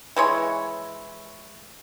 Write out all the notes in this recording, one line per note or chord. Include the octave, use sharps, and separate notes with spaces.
E3 G#3 C#5